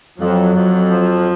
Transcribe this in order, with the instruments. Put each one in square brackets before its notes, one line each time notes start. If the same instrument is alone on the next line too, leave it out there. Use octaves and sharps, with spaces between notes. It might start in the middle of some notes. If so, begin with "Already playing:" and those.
[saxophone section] F2 [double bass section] F#3
[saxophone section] F2
F3